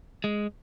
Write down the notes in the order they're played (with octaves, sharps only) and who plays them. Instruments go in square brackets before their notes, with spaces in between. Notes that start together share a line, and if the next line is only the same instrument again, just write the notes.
[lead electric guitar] G#3